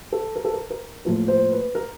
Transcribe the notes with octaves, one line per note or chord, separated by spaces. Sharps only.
A4
A#4
A4
A#4
A#4
A2 F3 A#3 A#4
C5
B4
A#4